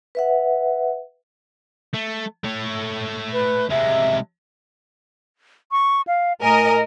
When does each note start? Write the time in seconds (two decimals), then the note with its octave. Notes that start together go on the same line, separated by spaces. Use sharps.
0.15 B4 E5 F#5
1.94 A3
2.44 A3 C#5
3.32 B4
3.70 C3 G#3 E5
5.71 C#6
6.07 F5
6.41 A2 A#4 D#5 G#5